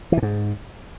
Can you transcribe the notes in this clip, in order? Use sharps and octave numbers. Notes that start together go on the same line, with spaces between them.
E3
A#2
G#2